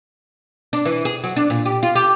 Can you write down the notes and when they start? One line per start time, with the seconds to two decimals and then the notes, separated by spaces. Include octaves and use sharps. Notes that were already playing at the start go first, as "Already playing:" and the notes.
0.73 D4
0.85 E3
1.05 G#4
1.24 F#3
1.36 D4
1.50 A#2
1.66 G4
1.83 F4
1.95 G4